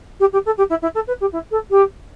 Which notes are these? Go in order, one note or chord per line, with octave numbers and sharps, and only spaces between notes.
G4
G4
A4
G4
E4
E4
A4
B4
G4
E4
A4
G4